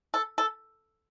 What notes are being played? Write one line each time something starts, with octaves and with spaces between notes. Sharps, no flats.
A4
A4